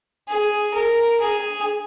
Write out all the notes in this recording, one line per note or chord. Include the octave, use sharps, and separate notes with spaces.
G#4
A#4
G#4